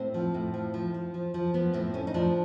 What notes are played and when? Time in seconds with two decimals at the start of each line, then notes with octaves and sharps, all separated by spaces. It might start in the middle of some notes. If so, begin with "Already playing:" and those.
Already playing: A2 C4
0.14 F3
0.34 A2
0.54 F3
0.74 F3
0.94 F3
1.14 F3
1.34 F3
1.54 F3 B3
1.74 A2 C4
1.94 A2 C#4
2.07 D#4
2.14 F3 D4